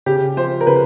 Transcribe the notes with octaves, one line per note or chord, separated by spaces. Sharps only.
C#3 G4
F3 C5
A#4
C#3 B4